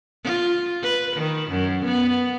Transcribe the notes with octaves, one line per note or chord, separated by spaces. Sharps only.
F4
B4
D#3
F#2
B3